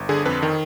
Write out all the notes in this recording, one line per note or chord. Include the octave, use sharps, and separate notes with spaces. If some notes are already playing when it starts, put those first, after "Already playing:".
Already playing: G1
D3 G#4
F2 B4
D#3